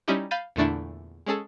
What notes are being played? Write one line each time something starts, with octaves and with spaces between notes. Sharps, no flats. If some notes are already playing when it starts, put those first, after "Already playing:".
G3 C#4 D#4 E4 G4
F5 B5 G6 A6 B6 D#7
E2 A#2 D3 A3 D4 E4
G#3 C#4 G#4 A4